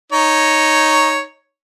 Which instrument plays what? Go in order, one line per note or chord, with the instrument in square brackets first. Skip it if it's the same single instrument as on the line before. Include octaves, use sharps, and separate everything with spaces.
[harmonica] D#4 C#5